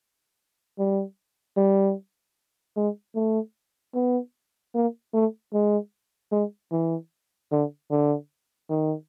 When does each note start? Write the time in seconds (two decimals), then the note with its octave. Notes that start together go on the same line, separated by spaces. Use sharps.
0.78 G3
1.57 G3
2.77 G#3
3.16 A3
3.94 B3
4.75 A#3
5.13 A3
5.53 G#3
6.32 G#3
6.72 E3
7.52 D3
7.91 D3
8.70 D#3